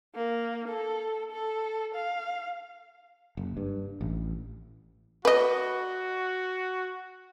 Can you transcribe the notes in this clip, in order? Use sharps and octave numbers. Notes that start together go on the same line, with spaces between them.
A#3
A4
A4
F5
F#1
G2
A1
F#4 B4 D#5